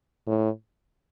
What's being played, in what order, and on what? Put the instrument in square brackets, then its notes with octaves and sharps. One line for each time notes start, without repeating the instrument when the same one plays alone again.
[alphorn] A2